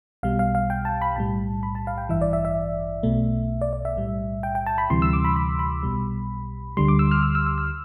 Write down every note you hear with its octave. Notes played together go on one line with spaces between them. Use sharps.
B1 B2 G3 F5
F5
F5
G5
A5
B5
B1 A2 G3 A5
B5
A5
F5
G5
A1 G2 E3 E5
D5
E5
E5
B1 B2 A3
D5
D5
E5
B1 A2 G3
G5
G5
A5
B5
D2 C3 E3 G3 C6
E6
D6
B5
B5
B5
B1 B2 G3
D2 D3 G3 C6
D6
E6
F6
E6
E6
E6
E6